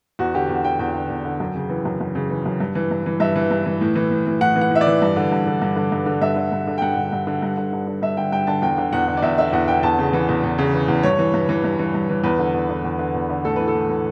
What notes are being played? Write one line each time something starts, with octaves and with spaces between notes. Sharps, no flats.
E2 F#4
D3 G4
E2
D3 G5
E2 G5
D3
E2
D3
F#2
C#3
E3
F#2
F#2
C#3
E3
F#2
G2
E3
G2
E3
G2 E5
E3
G2
E3
A2
E3
A2
E3
A2 F#5
E3
F#5
A2 E5
D5
E3
G2
D3
G2
D3
G2
D3
G2
D3
G2 E5
D3
G2
D3
G5
G2 F#5
D3
G2
D3
G2
D3
G2
D3
G2 E5
D3 G5
G2 G5
D3 A5
E2 G5
D3
E2 F#5
D3
D5
E2 E5
D3 E5
E2 F#5
D3 G5
E2 A5
C#3
E3
E2
E2
C#3
E3
E2
G2 C#5
E3
G2
E3
G2
E3
G2
E3
E2 B4
D3
E2
D3
E2
D3
E2
D3
A2 A4
E3 B4
A4
A2
E3